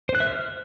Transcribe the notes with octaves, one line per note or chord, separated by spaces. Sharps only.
C5
F#6
E5
F6